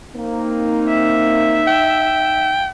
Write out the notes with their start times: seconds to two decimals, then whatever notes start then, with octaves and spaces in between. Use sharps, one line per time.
0.14 A#3 C4 D#4
0.88 E5
1.68 G5